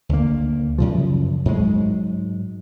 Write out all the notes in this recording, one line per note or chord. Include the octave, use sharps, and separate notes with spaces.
D2 A#3
F#2 C#3 F3
G#2 F#3 G#3